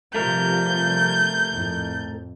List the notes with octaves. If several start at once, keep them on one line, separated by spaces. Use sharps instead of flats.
C3 F3 G3 A3 A#4 G6
F2 A2